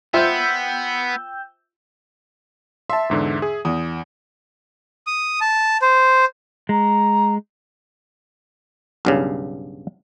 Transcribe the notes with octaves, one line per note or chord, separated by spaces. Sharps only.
B3 F4 C5 E5 G5 E6 G6
E5 A5 C6
E2 G#2 D3
G#4
E2 D#6
D#6
A5
C5
G#3 A#5
B1 G2 C#3